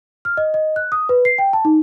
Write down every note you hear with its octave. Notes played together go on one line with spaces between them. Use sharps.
F6
D#5
D#5
F#6
D#6
B4
C7
G5
A5
D#4